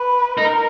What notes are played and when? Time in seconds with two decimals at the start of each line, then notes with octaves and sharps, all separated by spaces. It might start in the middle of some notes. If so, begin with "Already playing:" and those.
Already playing: B4
0.38 D#4 A#4